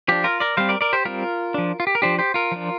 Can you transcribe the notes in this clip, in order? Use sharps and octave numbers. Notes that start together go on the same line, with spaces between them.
F3 D4 G4
F4 A#4
A#4 D5
G3 C4 C5 F5
A#4 D5
A#4 D5
G4 C5
G3 C4 F4 A#4
F3 D4
F4
G4
A#4
F3 D4 G4 C5
G4 C5
F4 A#4
F3 D4